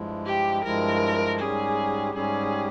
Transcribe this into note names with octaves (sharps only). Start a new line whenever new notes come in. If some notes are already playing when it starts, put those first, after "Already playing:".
Already playing: G2 F3 G#3 E4
G4
G2 F3 G#3 E4 A#4
G#2 G3 C#4 G4 G#4
G#2 G3 C#4 G4 G#4